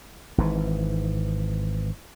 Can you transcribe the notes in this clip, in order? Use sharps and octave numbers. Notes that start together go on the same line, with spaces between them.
G#1 G#2 E3